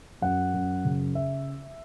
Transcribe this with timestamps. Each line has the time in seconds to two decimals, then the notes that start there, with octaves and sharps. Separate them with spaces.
0.22 F#2 F#5
0.54 F#2
0.85 C#3
1.15 E5